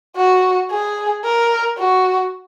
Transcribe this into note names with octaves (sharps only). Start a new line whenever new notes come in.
F#4
G#4
A#4
F#4